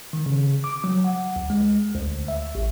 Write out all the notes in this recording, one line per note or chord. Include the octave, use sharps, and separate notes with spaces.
D#3
C#3
D6
F#3
F#5
D2
G#3
D2
E5
A1